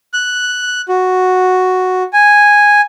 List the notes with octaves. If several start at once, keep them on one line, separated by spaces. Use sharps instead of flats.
F#6
F#4
G#5